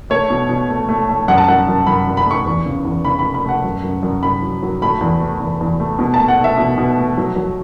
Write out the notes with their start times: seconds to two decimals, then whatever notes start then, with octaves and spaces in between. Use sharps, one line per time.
0.10 A3 C#5
0.30 B2
0.49 B2
0.70 A3
0.89 A3
1.09 A3
1.28 F#2 F#5
1.38 A5
1.48 F#2 F#5
1.68 F#2
1.87 F#2 B5
2.07 F#2
2.17 B5
2.26 A3 C#6
2.46 E2
2.66 C#3
2.85 E2
3.05 C#3 B5
3.19 A3 B5
3.34 B5
3.45 A3 F#5
3.63 F#2
3.83 F#2
4.03 F#2
4.23 F#2 B5
4.43 F#3
4.63 F#3
4.82 A3 B5
5.01 E2
5.21 A3
5.40 E2
5.61 E2
5.80 A3
5.99 B2
6.14 A5
6.20 A3
6.28 F#5
6.39 A3
6.44 E5
6.58 B2
6.78 B2
6.98 A3
7.17 F#3
7.36 F#3